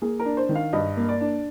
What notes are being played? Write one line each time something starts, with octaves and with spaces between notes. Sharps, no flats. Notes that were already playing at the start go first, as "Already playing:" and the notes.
A#3 G#4
A#4
D4
C5
D#3
F5
G2 D#5
A#3
D5
D4